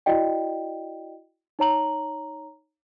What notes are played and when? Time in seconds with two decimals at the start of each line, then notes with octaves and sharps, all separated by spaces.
0.06 E4 F#4 D5 D#5 G5
1.59 D#4 C#5 A#5 F#7